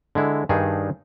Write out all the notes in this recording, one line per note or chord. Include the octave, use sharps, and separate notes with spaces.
D3 G#3 E4
G2 D#3 D4 D#4 G#4